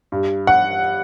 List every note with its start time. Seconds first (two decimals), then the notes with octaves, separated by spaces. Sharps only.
0.12 G2
0.47 F#5